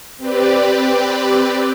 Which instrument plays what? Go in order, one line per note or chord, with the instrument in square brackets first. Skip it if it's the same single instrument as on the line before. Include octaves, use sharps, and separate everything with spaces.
[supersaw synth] C4 G4 B4 D5